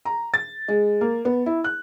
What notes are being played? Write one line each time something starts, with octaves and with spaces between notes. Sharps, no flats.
A#5
A6
G#3
A#3
B3
E4
F#6